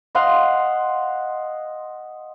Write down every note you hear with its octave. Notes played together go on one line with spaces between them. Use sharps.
D#5 F5 F#5 C6